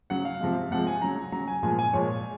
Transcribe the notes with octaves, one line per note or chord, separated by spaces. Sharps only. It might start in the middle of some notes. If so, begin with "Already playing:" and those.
C#3 F#3 F#5
F5
C3 F3 G#3
C3 F3 G#3 F#5
G#5
C#3 F#3 A#5
C#3 F#3 A#5
G#5
A#2 F3 G#3 G#5
G#5
A#2 F3 G#3 C#5